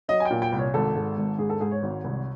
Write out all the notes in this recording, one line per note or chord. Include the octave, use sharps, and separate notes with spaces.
F#3 D#5
G#5
G5
A#2
G5
C2
C#5
G#1 A4
G#2
G#1
G#2 G#4
A4
G#2 G#4
C#5
G#1
C2